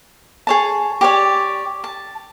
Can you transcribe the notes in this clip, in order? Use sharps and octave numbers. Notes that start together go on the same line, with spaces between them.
G#4 C#5 A5
G4 C#5 D5
A5